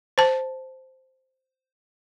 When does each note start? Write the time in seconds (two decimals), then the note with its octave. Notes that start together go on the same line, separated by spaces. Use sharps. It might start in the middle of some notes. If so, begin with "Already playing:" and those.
0.18 C5 A5